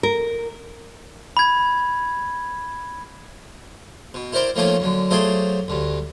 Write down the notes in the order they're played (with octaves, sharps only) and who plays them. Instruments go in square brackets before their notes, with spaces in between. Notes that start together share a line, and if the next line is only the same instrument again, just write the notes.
[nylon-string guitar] A#4
[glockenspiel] B5 G#6
[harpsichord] B2
E4 A#4 C5 D5 G5
D#3 F3 A3 A#3 C#4 F4
F#2 D3
F#3 A3 F4 G#4 C5 D5
D2 G2